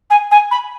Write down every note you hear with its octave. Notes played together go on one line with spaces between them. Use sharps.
G#5
G#5
B5